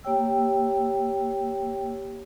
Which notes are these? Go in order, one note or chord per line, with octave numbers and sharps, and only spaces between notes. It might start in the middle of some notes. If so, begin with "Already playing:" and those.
A#3 G4 C#5 G5 E6